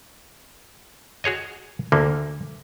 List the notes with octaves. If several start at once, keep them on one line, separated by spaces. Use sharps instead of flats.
F#4 G#4 C#5 D#5
D2 D3 A#3